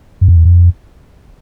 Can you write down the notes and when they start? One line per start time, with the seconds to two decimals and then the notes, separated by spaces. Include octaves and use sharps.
0.21 F#2
0.28 F2
0.36 E2
0.45 F2